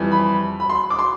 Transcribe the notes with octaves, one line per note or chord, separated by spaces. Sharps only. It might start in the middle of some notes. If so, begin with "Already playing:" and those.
Already playing: F2 E3 G3
B5
B5
C6
D6
C6